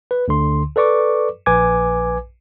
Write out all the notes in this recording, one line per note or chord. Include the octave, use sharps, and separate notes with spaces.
B4
D2 D3 C6
A4 B4 D5 C#6 D6
A#1 B4 G#5 D6 G#6